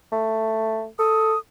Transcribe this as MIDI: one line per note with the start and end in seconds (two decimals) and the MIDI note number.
0.12 0.87 57
0.99 1.35 69
0.99 1.39 87